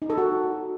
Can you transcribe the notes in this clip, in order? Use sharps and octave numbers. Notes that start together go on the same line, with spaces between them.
D#4
A4
F#4